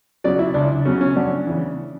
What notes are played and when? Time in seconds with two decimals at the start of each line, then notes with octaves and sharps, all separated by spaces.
0.24 C#3 F#3 D5
0.39 E4
0.54 C#2 D4
0.85 C#3 F#3 C#4
1.01 C#4
1.16 F#2 D4
1.47 C#3 E3